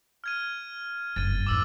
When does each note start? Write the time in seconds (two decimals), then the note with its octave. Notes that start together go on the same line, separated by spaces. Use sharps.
0.24 F6 G#6 D#7
1.16 F#1 G2 A6 D#7 G7
1.46 G#1 F2 D6 E6 A6